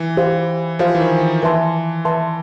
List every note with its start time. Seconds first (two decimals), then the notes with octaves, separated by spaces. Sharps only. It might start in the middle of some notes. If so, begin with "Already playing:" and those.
Already playing: E3
0.17 G4 C5 F5
0.79 F3 G4 C5 F5
0.95 E3
1.00 D#3
1.42 E3 B4 E5 A5 C6
2.05 B4 E5 A5 C6